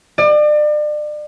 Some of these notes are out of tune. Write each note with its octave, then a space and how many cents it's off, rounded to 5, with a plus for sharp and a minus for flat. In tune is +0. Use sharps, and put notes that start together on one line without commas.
D5 +35